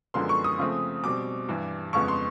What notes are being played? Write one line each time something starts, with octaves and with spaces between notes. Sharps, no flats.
F#2 D3 F3 G#3 B3 C6
C#6
D#6
C#3 F3 A3 C4
B2 G3 C4 D6
G2 E3 G3
F2 C#3 F3 G#3 B3 C#6
C6